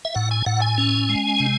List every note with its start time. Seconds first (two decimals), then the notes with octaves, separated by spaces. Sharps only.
0.05 E5
0.15 A2 F#5
0.31 G#5
0.46 A2 F#5
0.61 G#5
0.78 C#4
1.09 G#3
1.40 C3